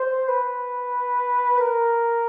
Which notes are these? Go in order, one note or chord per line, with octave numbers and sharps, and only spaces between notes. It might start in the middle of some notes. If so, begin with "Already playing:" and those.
Already playing: C5
B4
A#4